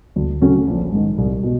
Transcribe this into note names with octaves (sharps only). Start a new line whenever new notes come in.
D2
C#3 F#3 A3 C#4
A#1
G#2 D#3
C2
B2